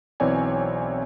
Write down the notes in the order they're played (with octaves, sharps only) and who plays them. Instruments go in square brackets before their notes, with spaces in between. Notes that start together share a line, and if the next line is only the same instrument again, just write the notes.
[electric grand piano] B1 E3 C4 C#5 D5 G#5